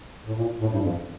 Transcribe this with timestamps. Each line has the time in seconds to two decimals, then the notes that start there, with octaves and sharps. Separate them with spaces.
0.26 A2
0.37 A#2
0.60 A2
0.72 G2
0.83 F2